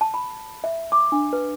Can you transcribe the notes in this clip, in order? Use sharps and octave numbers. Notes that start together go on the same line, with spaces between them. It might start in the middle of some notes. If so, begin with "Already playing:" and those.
A5
B5
E5
D6
D4
B4